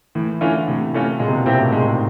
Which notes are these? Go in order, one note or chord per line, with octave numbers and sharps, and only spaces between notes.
A2 E3
D3 E3 A3 C#4 F4
A2 C3
E3 A3 C#4 F4
A#2 G#3
C3
B2
A#2 C4 E4 G4
A2
G#2 G#3